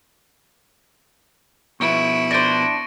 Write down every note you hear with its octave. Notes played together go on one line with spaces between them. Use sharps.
B2 F3 B3 E4 C#6 C#7 D7
D4 C5 A#6 D7 D#7